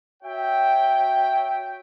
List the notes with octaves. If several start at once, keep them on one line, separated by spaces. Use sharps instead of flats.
F#4 C#5 E5 G5